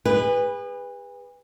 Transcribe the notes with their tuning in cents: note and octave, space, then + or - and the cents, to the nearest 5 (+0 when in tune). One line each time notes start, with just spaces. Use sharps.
G#4 -40 B4 +0